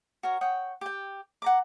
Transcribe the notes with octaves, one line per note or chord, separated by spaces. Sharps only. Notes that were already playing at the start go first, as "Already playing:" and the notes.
F#4 A#4 C#5
C#5 F#5 G5 D#6
G4 G5
F#5 A#5 D6